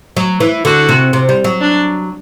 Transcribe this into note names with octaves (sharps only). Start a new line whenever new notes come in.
F#3
E3
D3 F#4
C3
C3
G3
F#3
D4